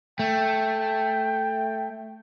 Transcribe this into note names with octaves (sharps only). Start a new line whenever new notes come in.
A3 G5